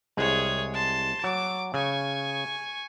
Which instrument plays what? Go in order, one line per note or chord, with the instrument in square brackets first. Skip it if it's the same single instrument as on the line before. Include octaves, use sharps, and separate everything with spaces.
[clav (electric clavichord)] C2 G#3 [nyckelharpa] G#4 C#5
[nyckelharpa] A5 C6
[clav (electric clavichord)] F#3 [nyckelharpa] D6
[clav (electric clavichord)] C#3 [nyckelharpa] G#5 C#6